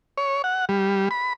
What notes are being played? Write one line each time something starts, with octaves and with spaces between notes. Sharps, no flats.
C#5
F#5
G3
B5